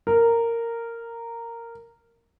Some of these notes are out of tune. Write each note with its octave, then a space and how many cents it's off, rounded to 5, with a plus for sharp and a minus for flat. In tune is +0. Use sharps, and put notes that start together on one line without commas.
A#4 -10